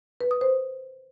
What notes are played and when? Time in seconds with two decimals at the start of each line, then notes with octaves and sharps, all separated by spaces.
0.21 B4
0.31 D#6
0.41 C5